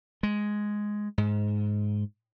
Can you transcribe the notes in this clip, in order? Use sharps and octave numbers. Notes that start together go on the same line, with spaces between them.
G#3
G#2